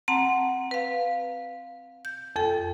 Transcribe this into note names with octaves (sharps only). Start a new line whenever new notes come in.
C4 F#5 A5 A#5
B4 F5
G6
F2 A4 G5